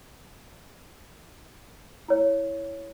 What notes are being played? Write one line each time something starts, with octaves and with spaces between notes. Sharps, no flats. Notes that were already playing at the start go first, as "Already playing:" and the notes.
E4 C#5